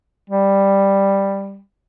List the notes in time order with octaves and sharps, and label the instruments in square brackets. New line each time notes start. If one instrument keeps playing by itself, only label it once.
[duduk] G3